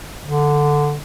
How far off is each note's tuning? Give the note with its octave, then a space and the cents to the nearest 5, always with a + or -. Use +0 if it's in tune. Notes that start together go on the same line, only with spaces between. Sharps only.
D3 +0